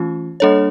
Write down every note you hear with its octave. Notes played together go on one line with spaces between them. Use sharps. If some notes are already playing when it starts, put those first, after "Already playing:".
Already playing: E3 A3 C#4 F4
G3 A#3 D4 A4 C#5